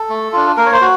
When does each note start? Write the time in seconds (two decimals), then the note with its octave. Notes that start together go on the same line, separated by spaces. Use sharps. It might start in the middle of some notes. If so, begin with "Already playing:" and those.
Already playing: A4
0.09 A3
0.33 D4 F4
0.57 A#3 A#4
0.66 C#5
0.73 C5
0.81 F#4